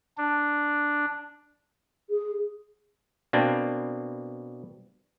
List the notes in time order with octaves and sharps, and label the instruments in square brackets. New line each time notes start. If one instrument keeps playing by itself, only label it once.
[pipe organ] D4
[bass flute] G#4
[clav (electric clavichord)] B2 A#3 C4 D4